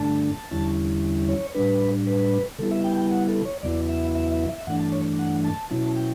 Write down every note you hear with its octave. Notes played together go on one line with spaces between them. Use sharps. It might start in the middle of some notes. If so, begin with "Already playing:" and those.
Already playing: G2 D3 A3 D4 A5
E2 D3 G3 C#4 E4
C#5
A2 G3 D4 B4
B4
C#3 G3 B3 E4 A4
E5
G5
G5
F#5
A4
C#5
E2 C#3 F#3 B3 E4 D5
E5
E5
E5
E5
G2 E3 A3 D4 F#5
A5
C#5
F#5
A5
B2 F#3 C#4 E4 A5
G5